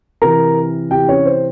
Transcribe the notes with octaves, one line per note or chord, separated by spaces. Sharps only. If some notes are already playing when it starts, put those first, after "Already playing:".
C3 E3 A#4 A#5
C3 E3 G4 G5
C#4 C#5
C5